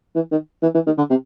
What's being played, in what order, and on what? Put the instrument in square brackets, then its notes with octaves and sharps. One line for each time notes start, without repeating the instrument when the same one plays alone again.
[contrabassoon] E3
D#3
E3
E3
D#3
D3
C3